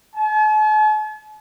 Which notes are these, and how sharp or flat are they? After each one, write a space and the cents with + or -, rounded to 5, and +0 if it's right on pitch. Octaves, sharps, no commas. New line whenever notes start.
A5 -45